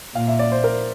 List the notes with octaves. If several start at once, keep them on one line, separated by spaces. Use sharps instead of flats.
A#2 F5
E5
D5
C5
A#4